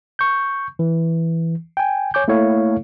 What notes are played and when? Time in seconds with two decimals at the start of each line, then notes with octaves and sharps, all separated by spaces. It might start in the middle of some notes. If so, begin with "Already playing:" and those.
0.19 C#6 G6
0.79 E3
1.77 G5 G#5
2.14 C#5 G#5 D6 G6
2.28 A3 A#3 E4 A4 C#5 F5